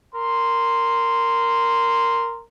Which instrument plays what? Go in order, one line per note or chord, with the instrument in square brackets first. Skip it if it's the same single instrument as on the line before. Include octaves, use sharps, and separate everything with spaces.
[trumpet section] A#4 C6